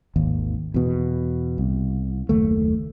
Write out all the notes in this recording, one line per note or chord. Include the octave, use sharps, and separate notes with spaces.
G#1 D#2
E2 B2
C2
F#1 D#2 A3